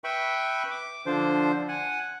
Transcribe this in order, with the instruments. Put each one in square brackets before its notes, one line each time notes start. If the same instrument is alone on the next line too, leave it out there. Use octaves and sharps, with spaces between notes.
[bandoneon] B4 E5 G5 B5 C#6
D6
D3 F3 D4 C5
F#5 G#5